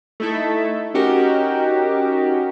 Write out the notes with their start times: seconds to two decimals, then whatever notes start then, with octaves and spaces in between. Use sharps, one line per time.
0.20 A3 D#4 E4 A4 E5
0.94 C#4 D#4 F#4 G4 A#4